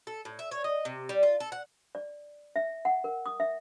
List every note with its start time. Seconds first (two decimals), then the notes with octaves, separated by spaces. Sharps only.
0.07 A4
0.25 A2
0.39 E5
0.51 C#5
0.64 D#5
0.85 C3
1.09 G3
1.23 F4
1.40 A4
1.52 F#5
1.95 D5
2.56 E5
2.85 F#5
3.04 A#4
3.26 D#6
3.40 E5